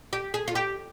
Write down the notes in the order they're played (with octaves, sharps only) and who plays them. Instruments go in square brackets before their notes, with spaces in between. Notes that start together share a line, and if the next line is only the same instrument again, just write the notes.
[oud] G4
G#4
F4
G4